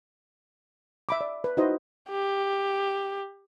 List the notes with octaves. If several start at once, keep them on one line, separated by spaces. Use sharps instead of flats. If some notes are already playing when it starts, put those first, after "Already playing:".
E5 B5 D6
D5
B4
D#4 E4 F#4 B4 C5 D#5
G4